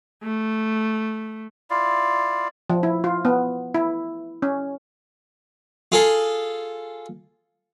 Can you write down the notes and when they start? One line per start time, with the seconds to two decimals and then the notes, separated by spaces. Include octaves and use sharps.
0.23 A3
1.70 E4 F4 D5 F5
2.70 F3
2.83 E4
3.04 F4
3.25 B3
3.74 E4
4.42 C#4
5.92 F4 G#4 A4